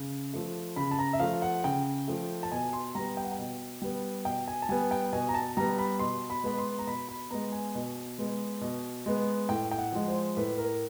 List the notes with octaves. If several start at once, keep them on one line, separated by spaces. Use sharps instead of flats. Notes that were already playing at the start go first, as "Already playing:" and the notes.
Already playing: C#3
F3 A3
C#3 B5
A5
A#5
E5
F3 A3 F5
F#5
C#3 G5
F3 A3
A5
B2 G#5
C6
G3 B3 A#5
G5
F#5
G5
B2
G3 B3
B2 G5
G#5
A5
G3 B3 G#5
G5
B2 G#5
A#5
A5
G3 B3 A#5
B5
B2 C6
B5
G#3 B3 B5
C6
A#5
B2 B5
B5
G#3 B3 A#5
G#5
B2
G#3 B3
B2
G#3 B3
A2 G5
G5
F#5
F3 G#3
C5
A2 B4
A#4